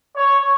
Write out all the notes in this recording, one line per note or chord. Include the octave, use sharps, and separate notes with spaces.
C#5